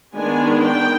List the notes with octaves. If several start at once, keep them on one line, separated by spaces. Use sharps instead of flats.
D#3 G#3 B3 D4 G#5
G5